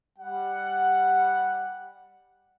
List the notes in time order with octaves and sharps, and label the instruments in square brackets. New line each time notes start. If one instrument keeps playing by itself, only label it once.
[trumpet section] G3 F#5